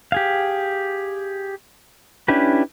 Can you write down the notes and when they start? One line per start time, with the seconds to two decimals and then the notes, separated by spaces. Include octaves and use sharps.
0.12 G4 G#4 F5
2.28 C#4 D4 E4 G4 B4